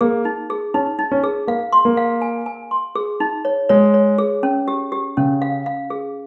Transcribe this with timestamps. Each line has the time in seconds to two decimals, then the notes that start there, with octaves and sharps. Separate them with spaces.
0.01 A#3 G#4
0.25 D#4
0.50 G#4
0.74 C#4 D#4
0.99 D#4
1.12 C#4
1.24 G#4
1.47 A#3 F5
1.72 C6
1.85 A#3
1.97 F5
2.21 G#5
2.46 G#5
2.71 C6
2.95 G#4
3.20 D#4
3.45 C#5
3.69 G#3 C#5
3.94 C#5
4.18 G#4
4.43 C#4
4.68 G4
4.92 G4
5.17 C#3 C#4
5.42 F5
5.66 F5
5.90 G#4